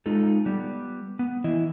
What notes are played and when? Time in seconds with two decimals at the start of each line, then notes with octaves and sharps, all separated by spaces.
0.06 G#3 D#4 F4 A4
0.45 G3 B3
1.19 B3
1.44 E3 E4 D#5